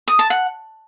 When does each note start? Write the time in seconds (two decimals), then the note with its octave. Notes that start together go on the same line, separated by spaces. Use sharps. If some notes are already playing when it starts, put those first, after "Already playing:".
0.08 D#6
0.19 A5
0.30 F#5